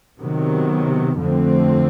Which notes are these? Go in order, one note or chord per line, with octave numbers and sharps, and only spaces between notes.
C3 D#3 F#3 B3
F2 D3 F3 A3 C4